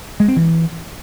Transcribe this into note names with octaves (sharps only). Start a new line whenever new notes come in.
G#3
C4
E3